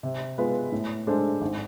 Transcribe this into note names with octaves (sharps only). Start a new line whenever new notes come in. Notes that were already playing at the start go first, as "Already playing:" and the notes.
C3
G#3 B3 F4 B4
A2
G#3 D4 A4 C5
G#1